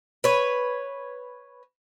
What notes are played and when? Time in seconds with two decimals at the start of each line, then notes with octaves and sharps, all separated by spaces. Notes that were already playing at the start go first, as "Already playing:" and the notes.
0.24 B4 C#5